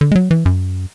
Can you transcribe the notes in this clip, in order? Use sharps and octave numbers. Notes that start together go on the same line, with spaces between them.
D3
G#3
F#3
E3
F#2